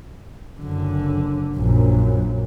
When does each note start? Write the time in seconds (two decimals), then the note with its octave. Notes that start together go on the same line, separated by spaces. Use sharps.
0.61 F#1 D3
1.57 A#1 F#2